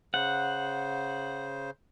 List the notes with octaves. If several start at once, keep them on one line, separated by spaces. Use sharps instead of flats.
C#3 C5 F#5